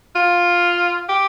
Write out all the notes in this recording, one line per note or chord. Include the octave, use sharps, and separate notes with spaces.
F4
G4